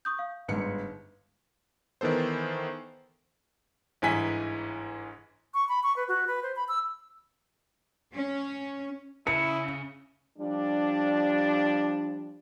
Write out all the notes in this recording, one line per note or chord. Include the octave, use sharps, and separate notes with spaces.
C#6 D#6 G6
F5
G1 G#2 C#7
D#3 E3 B3 A4 C5
G1 G#2 E3 G#5 B6
C#6
B5
C#6
B4
F#4
B4
C5
B5
E6
C#4
C#3 E4 C#7
F3 G3 D4